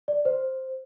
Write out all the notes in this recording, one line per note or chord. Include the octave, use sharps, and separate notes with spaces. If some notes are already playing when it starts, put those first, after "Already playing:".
D5
C5